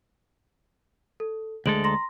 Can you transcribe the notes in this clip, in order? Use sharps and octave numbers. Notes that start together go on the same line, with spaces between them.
A4
D2 G#3 G#4 A4 D7 F#7
A#5 C6 A#6